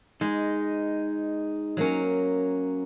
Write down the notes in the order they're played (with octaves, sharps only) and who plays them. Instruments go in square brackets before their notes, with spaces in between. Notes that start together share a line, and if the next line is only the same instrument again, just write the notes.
[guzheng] G#3 [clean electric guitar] D#4
[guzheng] F#3 A#3 C#4